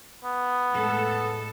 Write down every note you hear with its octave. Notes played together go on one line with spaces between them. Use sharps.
B3
A2 G#3 A4